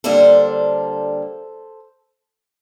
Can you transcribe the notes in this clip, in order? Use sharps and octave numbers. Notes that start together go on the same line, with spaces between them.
D3 G3 A#3 D4 A4 C5